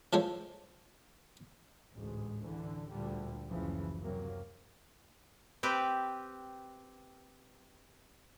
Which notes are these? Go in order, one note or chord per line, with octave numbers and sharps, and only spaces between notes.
E3 F3 G#3 A4 C5 C#5
A1 D2 G#2 G#3
A1 D3 E3
D2 A#2 D3 G3
F#1 D2 C#3 E3 F3
F#2 C3 F#3 A#3
C4 G4 B4